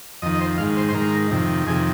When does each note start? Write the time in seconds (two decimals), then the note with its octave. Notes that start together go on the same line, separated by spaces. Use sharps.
0.22 F2 D#3 D#5
0.33 D#5
0.41 C5
0.58 G#2 D#3 F5
0.77 C5
0.89 C5
0.94 G#2 D#3 A#4
1.31 F2 C3 D#3
1.66 F2 C3 D#3 G#4